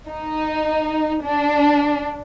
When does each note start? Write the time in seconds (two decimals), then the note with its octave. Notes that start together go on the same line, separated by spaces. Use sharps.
0.09 D#4
1.24 D4